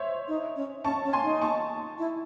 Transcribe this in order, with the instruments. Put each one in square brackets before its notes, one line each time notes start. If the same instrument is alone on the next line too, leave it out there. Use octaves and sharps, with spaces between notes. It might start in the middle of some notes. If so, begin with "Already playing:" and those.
Already playing: [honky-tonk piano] C5 C#5 E5
[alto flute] D#4
C#4
[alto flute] C#4 [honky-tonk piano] A5 C#6
[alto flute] C#4
[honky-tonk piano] G#5 C6
[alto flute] D#4
[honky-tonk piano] A5 C#6
[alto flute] E4